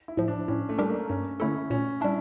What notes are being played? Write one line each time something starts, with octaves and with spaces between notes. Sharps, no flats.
E4
A2 F3
D4
A2 C#4
A3
G3 D4 G4 A#4
A#3
G2 C#4
D3 A3 C#4 E4 A4
A#2 C#4
G3 D4 E4